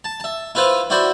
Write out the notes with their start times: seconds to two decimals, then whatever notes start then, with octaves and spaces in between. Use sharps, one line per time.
0.04 A5
0.20 E5 A5
0.55 E4 F4 B4 C5 F5
0.90 E4 F#4 C5 D5 B5